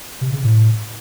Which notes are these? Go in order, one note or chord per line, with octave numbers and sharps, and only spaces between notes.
C3
C#3
A2